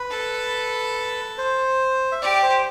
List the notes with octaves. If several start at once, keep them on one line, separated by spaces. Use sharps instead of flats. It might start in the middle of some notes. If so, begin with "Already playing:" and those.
Already playing: B4
A4
C5
E5
G4 D5
C5